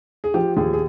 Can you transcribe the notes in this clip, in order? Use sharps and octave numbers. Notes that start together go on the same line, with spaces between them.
G#4
F3 G4
D#2 G#4
G#4